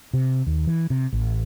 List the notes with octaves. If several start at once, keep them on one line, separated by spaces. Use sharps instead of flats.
C3
D#2
E3
C3
A1